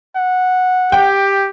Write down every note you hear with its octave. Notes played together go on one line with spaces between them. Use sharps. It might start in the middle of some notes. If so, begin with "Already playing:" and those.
F#5
G4 G5